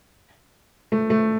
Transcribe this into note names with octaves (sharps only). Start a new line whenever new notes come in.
A3
A3